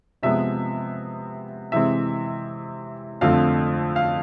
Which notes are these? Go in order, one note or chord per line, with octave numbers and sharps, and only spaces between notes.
C3 F3 G#3 B3 E5
C3 E3 G#3 C4 E5
F2 D3 F3 A3 C4 F5
F5